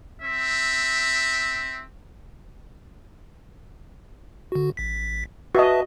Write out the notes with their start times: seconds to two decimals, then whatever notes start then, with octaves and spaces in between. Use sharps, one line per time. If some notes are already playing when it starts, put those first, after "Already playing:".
0.22 C4 E5
4.52 D3 F#4
4.77 A1 B6
5.55 F#4 B4 D#5 E5 A5